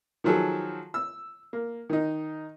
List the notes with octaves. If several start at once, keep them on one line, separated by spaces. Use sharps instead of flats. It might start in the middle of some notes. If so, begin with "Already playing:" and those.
D#3 F3 F#3 G#4 A4
E6
A#3
D#3 D#4